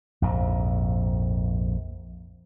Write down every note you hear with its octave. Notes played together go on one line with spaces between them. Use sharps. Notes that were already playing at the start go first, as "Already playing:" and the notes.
A#1 F2 G#2